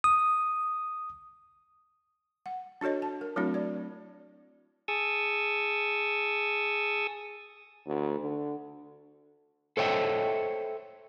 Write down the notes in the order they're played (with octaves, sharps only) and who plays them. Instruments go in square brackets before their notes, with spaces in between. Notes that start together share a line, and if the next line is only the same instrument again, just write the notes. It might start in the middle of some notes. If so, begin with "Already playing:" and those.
[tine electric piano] D#6
[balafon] F#5
D4 F#4 A4 C#5 D#5
A5
A#4
F#3 A3 C4 D4 E4 F#4
D5
[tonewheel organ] G#4 G#5 A5 C#6 D#6 E6
[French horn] D2
D3
[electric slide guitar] A4 C5 C#5 D#5 E5 G5